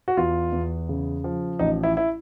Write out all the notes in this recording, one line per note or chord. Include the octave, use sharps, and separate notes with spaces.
F#4
E2 F4
E2
C#3
F3
A1 D#4
E4
E4